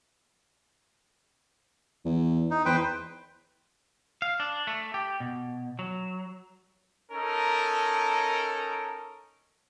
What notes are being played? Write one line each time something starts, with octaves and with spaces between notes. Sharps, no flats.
E2
D#4
E2 B4 C5 G5
F5
D4
A3
G4
B2
F#3
C#4 D#4 A4 A#4